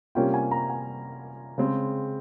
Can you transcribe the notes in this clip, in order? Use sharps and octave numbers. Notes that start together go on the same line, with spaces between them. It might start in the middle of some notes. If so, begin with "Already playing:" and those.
C3 G3 A#3 C#4 F4 G5
G#5
A#5
G#5
C#3 G#3 C4